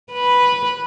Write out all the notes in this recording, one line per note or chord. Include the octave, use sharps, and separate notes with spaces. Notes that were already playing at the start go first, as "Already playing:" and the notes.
B4